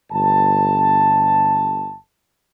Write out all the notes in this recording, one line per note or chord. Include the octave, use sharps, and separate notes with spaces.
G1 A5